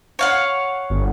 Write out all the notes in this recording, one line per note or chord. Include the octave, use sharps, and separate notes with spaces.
C#5 F5 F#5
G1